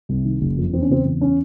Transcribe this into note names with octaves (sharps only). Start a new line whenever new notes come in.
C2
D#3
F#1
F2
E2 C4
C#4
C#3 C4
E2
C#4